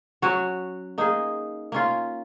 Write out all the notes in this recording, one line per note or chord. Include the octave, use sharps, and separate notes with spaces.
F#3 C#4 F#4 C#5
A#3 D#4 G#4
A#3 C#4 F4